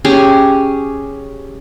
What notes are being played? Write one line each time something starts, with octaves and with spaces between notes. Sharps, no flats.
C#4 G4 G#4